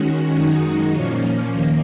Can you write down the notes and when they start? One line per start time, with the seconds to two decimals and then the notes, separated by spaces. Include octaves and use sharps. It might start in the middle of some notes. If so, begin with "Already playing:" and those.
Already playing: D#3 G#3 C#4 F#4
0.34 F#2 D#3 G#3 D#4 F#4
0.93 A#2 F3 A#3 C#4
1.52 D#2 D#3 A#3